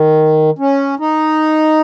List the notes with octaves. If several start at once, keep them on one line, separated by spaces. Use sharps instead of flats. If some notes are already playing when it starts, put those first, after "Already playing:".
Already playing: D#3
C#4
D#4